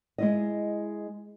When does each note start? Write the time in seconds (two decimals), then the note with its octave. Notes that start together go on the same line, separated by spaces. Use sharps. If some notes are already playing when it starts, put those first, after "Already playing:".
0.18 G#3 E4 D#5